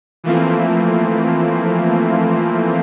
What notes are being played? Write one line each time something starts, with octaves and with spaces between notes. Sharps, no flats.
E3 F3 A3 A#3 C4